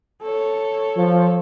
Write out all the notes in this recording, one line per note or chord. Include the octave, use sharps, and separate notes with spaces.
A4 C#5
F3